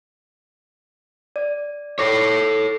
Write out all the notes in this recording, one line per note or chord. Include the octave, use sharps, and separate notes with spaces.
D5
A4 C#5 D6 A#6 C7